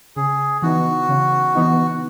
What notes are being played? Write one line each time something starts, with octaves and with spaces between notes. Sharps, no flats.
C#3 G#4
E3 B3 D#4 F#4
C#3
E3 B3 D#4